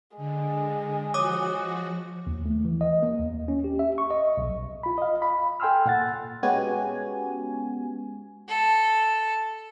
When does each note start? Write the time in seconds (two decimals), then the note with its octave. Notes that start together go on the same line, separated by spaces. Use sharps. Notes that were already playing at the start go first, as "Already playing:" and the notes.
0.17 D3 G#3
1.14 F3 F#4 C#5 D6 D#6
2.27 D#2
2.46 A3
2.65 E3
2.81 D#5
3.03 A#3
3.19 D#2
3.48 C#4
3.64 G4
3.79 E5
3.98 C#6
4.10 D#5
4.38 B1
4.83 F4 B5
4.98 D#5 F5
5.22 B5
5.60 A4 G5 G#5 C6 E6 F6
5.86 A#2 F#5 A6
6.43 G#3 B3 C#4 F#4 G4 G#5
8.48 A4